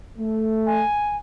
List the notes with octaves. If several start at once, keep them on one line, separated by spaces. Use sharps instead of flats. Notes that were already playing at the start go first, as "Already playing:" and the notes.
A3
G#5